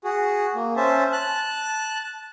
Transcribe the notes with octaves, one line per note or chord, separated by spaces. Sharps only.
F#4 G#4
A#3
C#4 C5 E5 A5
A5 F#6